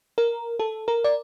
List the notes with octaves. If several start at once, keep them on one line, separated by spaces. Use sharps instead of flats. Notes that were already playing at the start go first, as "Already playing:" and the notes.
A#4
A4
A#4
D5